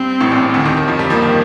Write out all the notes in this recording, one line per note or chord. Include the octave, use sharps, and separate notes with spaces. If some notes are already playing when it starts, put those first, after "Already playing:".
Already playing: G2 C4
A1 A2
A#1 A#2
D2 D3
D#2 D#3
D#2 D#3
F2 F3
G2 G3
F2 F3 A#3
D#3